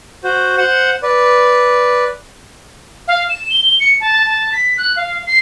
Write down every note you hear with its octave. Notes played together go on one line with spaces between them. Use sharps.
F#4 C5
C5 F#5
B4 D5
F5
E7
G7
C#7
A5
A5
B6
F#6
F5
C7